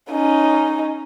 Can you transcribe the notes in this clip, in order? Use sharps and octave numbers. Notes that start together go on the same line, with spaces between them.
C#4 D#4